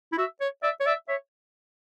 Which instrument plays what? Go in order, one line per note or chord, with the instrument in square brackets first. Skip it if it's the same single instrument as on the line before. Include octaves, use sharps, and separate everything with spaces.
[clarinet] E4
[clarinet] F#4 [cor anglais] E5
[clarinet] C#5
[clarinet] D5 [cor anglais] E5
[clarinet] C#5
[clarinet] D5 [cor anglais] E5
[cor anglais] C#5 [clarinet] E5